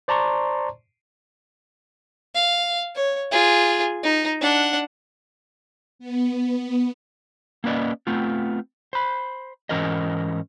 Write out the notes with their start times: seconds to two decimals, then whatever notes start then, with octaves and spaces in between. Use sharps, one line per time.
0.08 C5 D5 A5 A#5 C6 C#6
2.35 F5
2.95 C#5
3.32 F4 G#4
4.03 D#4
4.41 D4 F#5
5.99 B3
7.64 A#3 C#4 B4 D5 D#5
8.07 A3 B3 C4 F4
8.93 C5 B5
9.69 G#2 E3 C#4 A#4 C5 D#5